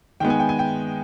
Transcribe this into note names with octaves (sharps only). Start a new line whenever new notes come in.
D#3 G#3 B3 G5
G#5
G5
G#5
G5